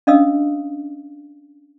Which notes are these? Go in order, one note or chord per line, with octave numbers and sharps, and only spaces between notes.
C#4 D4 D#5 F5 D#6 E6